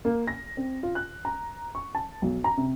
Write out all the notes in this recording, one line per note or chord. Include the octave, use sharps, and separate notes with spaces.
A#3
A#6
C4
F4
F#6
A#5
C#6
A5
B1
A#5
C3